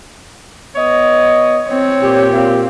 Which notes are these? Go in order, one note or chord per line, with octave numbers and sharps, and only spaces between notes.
B3 C#5 D#5
C4 C#5
A#2 G4
C4 F5